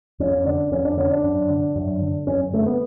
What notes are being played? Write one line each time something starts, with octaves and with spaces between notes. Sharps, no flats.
F2 C#4
D3 D4
F2 C#4
D4
D3 C#4
D4
F#2
D3
F#2
D3
F#2 C#4
D3 A3
B3